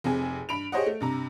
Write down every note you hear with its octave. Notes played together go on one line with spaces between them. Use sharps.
F1 C3 C4 G#4 G#5
G2 B5 D7 F7
G4 G#4 C5 C#5 D#5 F#5
A3
G2 C3 A#5